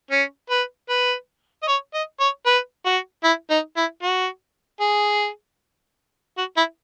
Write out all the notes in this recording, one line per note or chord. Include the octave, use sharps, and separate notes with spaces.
C#4
B4
B4
D#5
C#5
D#5
C#5
B4
F#4
E4
D#4
E4
F#4
G#4
F#4
E4